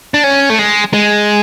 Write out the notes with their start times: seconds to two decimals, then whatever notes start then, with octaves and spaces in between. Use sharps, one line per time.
0.14 D4
0.24 C#4
0.50 A3
0.59 G#3
0.93 G#3